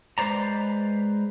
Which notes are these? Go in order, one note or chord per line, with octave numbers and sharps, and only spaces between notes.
G#3 B4 C5 D5 A#5